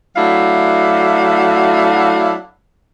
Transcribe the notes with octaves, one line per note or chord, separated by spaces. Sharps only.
F#3 A3 D4 E4 F#4 F5